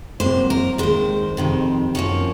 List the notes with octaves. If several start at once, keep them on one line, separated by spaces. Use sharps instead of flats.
C3 F#3 A#3 C5
A#4
D#2 D#3 G#3 C5
F2 C3 D#3
F#2 F3 A#3 C#5